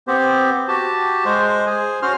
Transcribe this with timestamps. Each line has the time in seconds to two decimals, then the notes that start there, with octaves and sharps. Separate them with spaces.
0.08 B3 C4 G4 C5
0.68 F#4 G4 A5
1.25 G#3 C5
1.66 G#4 C5 G#5
2.02 C#4 F#4 C5 C6 F6